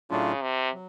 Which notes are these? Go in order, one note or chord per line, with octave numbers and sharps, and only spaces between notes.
A2 C#3 F#3 A3 D4 F4
C3
F#3